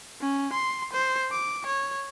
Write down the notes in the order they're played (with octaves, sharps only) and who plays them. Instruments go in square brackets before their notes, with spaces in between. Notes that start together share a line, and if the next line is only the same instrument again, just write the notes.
[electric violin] C#4
C6
C5
D6
C#5